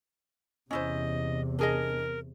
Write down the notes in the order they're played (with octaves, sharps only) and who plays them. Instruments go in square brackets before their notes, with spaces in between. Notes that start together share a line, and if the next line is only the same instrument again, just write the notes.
[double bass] E2 C3 [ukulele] C#4 E4 C5 [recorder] D#5
[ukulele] D4 G#4 D#5 [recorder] A#4